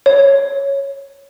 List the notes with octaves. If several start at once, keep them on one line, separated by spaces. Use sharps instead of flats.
C#5